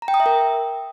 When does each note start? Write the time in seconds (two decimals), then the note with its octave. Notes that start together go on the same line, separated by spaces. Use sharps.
0.02 A#5
0.08 G5
0.14 D#6
0.20 E5
0.26 A#4